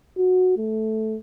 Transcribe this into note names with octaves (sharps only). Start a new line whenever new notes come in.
F#4
A3